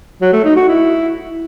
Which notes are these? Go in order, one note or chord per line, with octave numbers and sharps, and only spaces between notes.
F#3
A3
D#4
F#4
E4